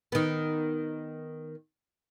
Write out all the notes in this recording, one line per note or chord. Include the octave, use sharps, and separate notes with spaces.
D#3 B3